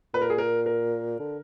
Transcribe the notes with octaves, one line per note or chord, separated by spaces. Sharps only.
A#2 B4
A#4
G#4
A#4
A#4
D3